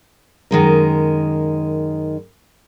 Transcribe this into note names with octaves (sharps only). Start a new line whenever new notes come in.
F#2 D#3 G#3 A#4